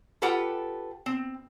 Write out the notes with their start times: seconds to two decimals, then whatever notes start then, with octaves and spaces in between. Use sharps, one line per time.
0.22 F4 G4 A4 B4 F#5 G5
1.06 C4